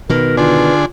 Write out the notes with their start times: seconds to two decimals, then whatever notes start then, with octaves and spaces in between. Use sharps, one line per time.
0.10 B2 D#3 A#4 B4
0.37 D3 D4 F4 G#4